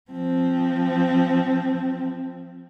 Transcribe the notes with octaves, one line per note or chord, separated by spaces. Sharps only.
F3 C4